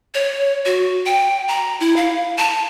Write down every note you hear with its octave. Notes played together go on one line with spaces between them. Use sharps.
C#5
F#4
G5
A#5
E4
F5
A5